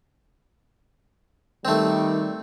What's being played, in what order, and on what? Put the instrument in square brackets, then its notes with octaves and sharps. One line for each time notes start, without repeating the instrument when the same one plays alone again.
[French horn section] D#3 G3 [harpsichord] A3 C4